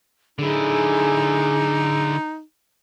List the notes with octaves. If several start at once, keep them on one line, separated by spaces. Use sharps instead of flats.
D3 D#4 E4 G#4